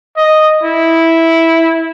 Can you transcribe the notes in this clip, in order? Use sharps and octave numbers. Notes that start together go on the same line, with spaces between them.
D#5
E4